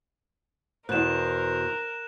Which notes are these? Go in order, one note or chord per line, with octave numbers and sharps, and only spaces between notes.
E2 B2 A#4 C5 F#6 E7